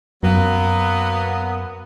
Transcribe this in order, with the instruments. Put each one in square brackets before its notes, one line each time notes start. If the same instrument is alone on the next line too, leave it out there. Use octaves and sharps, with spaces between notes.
[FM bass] F#2 [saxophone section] F#3 A#3 B3